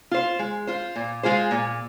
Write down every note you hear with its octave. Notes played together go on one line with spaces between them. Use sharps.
F4 C5
G#3
F4 C5
A#2
G#3 F4 G#4 C5
A#2